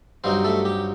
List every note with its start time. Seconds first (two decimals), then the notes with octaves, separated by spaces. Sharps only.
0.24 G2 F#3 C4 D#4 C5
0.44 A3 A4
0.65 G4